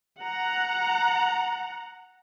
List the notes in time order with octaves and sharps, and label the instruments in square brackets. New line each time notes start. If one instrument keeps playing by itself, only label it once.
[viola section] F#5 A#5